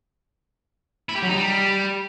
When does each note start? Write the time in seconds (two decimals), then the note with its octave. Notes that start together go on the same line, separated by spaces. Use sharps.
1.09 E4
1.16 G4
1.23 F#3
1.29 D#4
1.36 G3